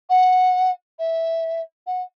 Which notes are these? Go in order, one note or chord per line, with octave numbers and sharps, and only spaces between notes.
F#5
E5
F#5